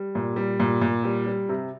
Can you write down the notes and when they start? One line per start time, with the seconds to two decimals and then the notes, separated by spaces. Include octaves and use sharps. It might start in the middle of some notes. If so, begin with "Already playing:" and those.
Already playing: G3
0.15 A#2
0.36 G3
0.60 A#2
0.81 A#2
1.04 G3
1.27 G3
1.49 C3